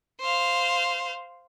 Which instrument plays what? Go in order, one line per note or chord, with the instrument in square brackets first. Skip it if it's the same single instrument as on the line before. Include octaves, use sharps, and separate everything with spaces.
[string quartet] C5 F5